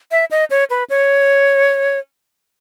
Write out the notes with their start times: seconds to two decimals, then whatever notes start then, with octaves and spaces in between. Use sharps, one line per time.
0.11 E5
0.31 D#5
0.50 C#5
0.70 B4
0.90 C#5